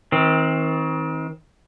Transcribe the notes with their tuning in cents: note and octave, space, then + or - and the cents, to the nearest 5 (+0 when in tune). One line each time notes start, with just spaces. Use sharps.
D#3 +40 C4 +10